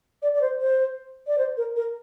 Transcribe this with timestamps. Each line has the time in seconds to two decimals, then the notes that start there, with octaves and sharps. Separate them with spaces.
0.22 D5
0.34 D5
0.41 C5
0.60 C5
1.27 D5
1.38 C5
1.57 A#4
1.76 A#4